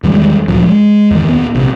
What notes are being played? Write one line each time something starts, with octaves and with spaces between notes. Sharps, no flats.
E2 D#3 G3 G#3
D2 A#2 F3 F#3
G#3
E2 D#3
D1 B3
A#1 C3